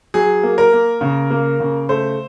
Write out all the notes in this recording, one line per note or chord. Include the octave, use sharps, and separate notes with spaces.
F#3 G#4
A#3
A#4
A#3
C#3
A#3
C#3
A3 C5